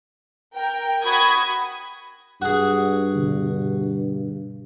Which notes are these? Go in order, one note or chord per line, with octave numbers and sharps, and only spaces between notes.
A#4 G5
F#4 B5 D#6 G#6
G2 F#4 G#4
B2 D3